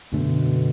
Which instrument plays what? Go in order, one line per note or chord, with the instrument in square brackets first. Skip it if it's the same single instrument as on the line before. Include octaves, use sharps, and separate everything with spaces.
[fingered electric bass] F#2 D3 A3 [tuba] B2